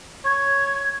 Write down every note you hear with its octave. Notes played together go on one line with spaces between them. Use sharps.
C#5 G#6